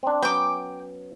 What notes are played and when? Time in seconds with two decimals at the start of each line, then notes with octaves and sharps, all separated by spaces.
0.03 C4 D4
0.23 F#3 B3 C#4 G5 D6